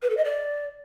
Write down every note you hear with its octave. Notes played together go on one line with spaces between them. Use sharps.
B4
A4
D#5
D5